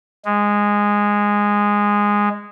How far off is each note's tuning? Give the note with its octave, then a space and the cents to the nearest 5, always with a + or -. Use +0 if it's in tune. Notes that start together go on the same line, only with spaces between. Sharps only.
G#3 -10